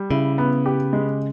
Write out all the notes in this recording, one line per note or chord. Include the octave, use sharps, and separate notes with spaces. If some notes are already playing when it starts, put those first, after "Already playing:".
Already playing: G3
C#3 E4
B3
G4
G#3